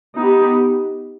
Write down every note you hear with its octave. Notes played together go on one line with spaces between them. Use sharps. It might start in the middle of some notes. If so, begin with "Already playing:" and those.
B3 D#4 G4